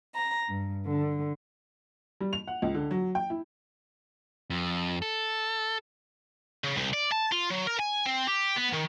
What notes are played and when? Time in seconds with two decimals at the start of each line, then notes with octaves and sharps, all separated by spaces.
0.15 A#5
0.49 G2
0.85 D3
2.21 G3
2.33 F7
2.47 F#5
2.62 C#2
2.75 D3
2.91 F#3
3.15 G5
3.30 E4
4.50 F2
5.02 A4
6.64 C#3
6.77 C2
6.93 D5
7.12 A5
7.32 F4
7.51 F#3
7.67 A#4
7.80 G#5
8.06 C4
8.28 G4
8.57 B3
8.74 D#3